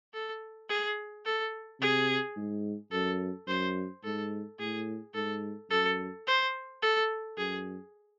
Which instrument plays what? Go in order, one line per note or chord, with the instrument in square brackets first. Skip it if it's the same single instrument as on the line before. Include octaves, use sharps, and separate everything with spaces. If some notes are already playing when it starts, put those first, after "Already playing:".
[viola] A4
G#4
A4
[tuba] C3 [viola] G#4
[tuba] G#2
[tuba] F#2 [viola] A4
[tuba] F#2 [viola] C5
[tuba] G#2 [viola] A4
[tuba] A2 [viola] G#4
[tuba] G#2 [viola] A4
[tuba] F#2 [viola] A4
[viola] C5
A4
[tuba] F#2 [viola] G#4